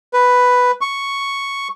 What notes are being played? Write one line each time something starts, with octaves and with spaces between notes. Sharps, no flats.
B4
C#6